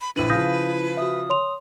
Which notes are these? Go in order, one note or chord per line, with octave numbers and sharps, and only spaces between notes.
B5
A#1 E3 D4 E4 B4 D#7 F#7
C#3 F3 D#6 G6 A#6
F#4 E5 D#6
C#5 C6 F7